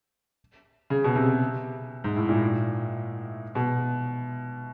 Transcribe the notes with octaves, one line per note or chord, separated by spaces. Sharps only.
C#3
B2
C3
G#2
A2
A#2
B2